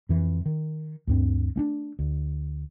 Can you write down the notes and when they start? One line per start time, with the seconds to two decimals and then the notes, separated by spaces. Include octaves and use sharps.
0.09 F2 E3
0.46 D#3
1.07 D2 G2 C4
1.56 A3 C#4 D4
1.99 D2